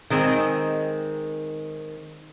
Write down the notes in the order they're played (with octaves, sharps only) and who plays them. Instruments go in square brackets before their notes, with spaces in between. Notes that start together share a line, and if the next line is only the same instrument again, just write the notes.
[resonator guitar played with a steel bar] D#3 G#3 C4